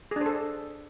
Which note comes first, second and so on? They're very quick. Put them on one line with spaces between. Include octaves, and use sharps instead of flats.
G#4 D4 C5 A4